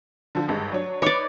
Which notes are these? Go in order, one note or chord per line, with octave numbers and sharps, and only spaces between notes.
D3 F3
G#1 G2 G#3
F#3 D4 C#5
D#4 B4 C#5 D5 D6